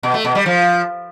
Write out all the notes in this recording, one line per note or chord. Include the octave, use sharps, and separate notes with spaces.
B2
A3
B2
G3
F3